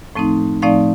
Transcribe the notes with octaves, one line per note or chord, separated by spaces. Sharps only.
A2 F3 A3 C4 D#4
A2 F3 A3 C4 D#4 D5 F5